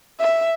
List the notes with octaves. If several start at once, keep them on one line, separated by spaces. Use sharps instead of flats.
E5